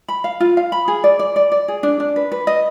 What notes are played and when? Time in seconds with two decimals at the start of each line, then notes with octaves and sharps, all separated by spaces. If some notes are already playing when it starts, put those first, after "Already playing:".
0.08 B5
0.24 F5
0.40 F4
0.57 F5
0.72 B5
0.88 G#4
1.04 D5
1.19 D5
1.36 D5
1.52 D5
1.68 G#4
1.83 D4
2.00 D4
2.16 B4
2.32 B4
2.47 D#5